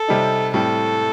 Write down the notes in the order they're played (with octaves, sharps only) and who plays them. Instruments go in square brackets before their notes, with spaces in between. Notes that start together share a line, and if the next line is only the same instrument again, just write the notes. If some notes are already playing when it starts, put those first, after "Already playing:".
Already playing: [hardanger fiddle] A4
[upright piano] C3 G3 C4 D#4
[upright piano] A2 G3 C4 [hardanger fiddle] A4